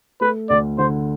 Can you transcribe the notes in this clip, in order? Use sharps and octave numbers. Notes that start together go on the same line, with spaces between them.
A3 B4
D2 D5
D3 C5